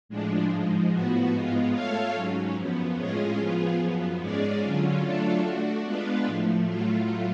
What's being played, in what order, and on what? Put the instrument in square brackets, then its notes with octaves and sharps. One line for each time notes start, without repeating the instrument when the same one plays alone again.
[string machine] A2 F3 G#3 D4
G#2 F3 G#3
A2 F3 B3 F#4
G#2 G#3 B3 F4
A3 F4 A4 C#5 F5
G#2 F#3 C#4
F#2 F3 B3
A2 G#3 C#4 F4 G#4
F3 B3 F4 G#4
F#2 F3 B3
G#2 G#3 C#4 G#4 D5
D3 F#3 C#4 F4
F#3 A3 D4 F4 A4
A3 D4 F#4
G#3 B3 D4 F4 B4
A2 F3 A3
A2 F#3 A3 F4